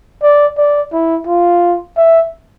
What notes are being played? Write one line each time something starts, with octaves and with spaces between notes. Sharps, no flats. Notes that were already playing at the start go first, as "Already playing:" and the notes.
D5
D5
E4
F4
E5